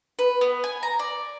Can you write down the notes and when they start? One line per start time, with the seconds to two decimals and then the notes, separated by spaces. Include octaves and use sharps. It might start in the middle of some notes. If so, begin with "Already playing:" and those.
0.19 B4
0.41 B3
0.64 G#5
0.83 A#5
0.99 D5